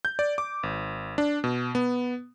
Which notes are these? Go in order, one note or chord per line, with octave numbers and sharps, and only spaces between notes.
G6
D5
D6
G#1
D4
B2
B3